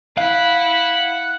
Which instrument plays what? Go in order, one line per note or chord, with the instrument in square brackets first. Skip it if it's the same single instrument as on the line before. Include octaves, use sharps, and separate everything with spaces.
[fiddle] E4 [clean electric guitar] F5 [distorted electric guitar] F#5